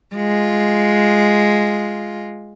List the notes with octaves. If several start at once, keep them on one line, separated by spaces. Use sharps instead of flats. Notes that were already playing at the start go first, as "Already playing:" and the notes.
G#3 F4